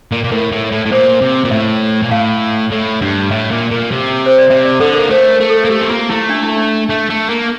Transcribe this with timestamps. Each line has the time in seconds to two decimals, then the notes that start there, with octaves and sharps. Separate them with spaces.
0.12 A#2
0.24 A#2
0.31 A2 A#4
0.52 A2
0.72 A2
0.86 A2
0.92 A#2 C5
1.21 C3
1.44 A#2
1.51 A2 E5
2.03 A#2
2.11 A2 F5
2.71 A2
3.01 G2
3.31 A2 E5
3.51 A#2
3.71 A#2
3.91 C3
4.26 C5
4.38 D5
4.50 C3 E5
4.65 D5
4.80 D3 A4
4.95 A#4
4.99 A#3
5.10 A3 C5
5.30 A#4
5.40 A3
5.49 A4
5.64 A#3
5.70 A3 G4
5.80 C4
5.89 A#3 F4
6.10 A3 E4
6.29 D4
6.43 E4
6.57 D4
6.90 A3
7.10 A3
7.29 A#3